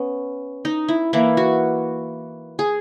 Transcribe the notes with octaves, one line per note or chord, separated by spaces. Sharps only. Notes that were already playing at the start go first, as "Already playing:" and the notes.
Already playing: B3 C#4
D#4
E4
E3 A#3 E4
F#4
G#4